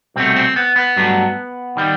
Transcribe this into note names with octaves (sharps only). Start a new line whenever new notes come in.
C2 B2 A3 C4
C4
B3
B3
G2 F#3 A3
D#3 G3